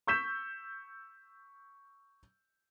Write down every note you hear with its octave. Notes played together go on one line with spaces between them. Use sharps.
C#6 E6 G6 B6 E7